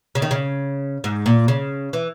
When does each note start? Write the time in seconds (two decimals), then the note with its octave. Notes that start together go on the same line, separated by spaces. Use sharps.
0.15 C#3
0.22 D#3
0.31 C#3
1.04 G#2
1.26 A#2
1.48 C#3
1.93 E3